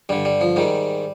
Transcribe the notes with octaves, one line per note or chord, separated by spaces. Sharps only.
G2 D3 G3
G3
F3
G#2 D#3 G3